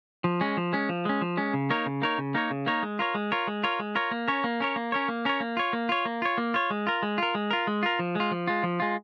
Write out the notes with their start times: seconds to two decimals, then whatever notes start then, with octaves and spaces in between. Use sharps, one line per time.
0.24 F3
0.41 G#3 C#4
0.57 F3
0.73 G#3 C#4
0.89 F3
1.05 G#3 C#4
1.21 F3
1.37 G#3 C#4
1.54 C#3
1.70 A#3 D#4 A#4 C#5
1.86 C#3
2.02 A#3 D#4 A#4 C#5
2.18 C#3
2.34 A#3 D#4 A#4 C#5
2.51 C#3
2.66 A#3 D#4 A#4 C#5
2.83 G#3
2.99 F4 A#4 C#5
3.15 G#3
3.32 F4 A#4 C#5
3.47 G#3
3.63 F4 A#4 C#5
3.79 G#3
3.95 F4 A#4 C#5
4.11 A#3
4.28 C#4 A#4 C#5
4.44 A#3
4.60 C#4 A#4 C#5
4.76 A#3
4.92 C#4 A#4 C#5
5.08 A#3
5.25 C#4 A#4 C#5
5.40 A#3
5.57 F4 C#5
5.73 A#3
5.89 F4 C#5
6.05 A#3
6.22 F4 C#5
6.38 A#3
6.54 F4 C#5
6.70 G#3
6.87 F4 A#4
7.03 G#3
7.18 F4 A#4
7.35 G#3
7.51 F4 A#4
7.67 G#3
7.83 F4 A#4
7.99 F3
8.15 G#3 F4
8.31 F3
8.47 G#3 F4
8.63 F3
8.80 G#3 F4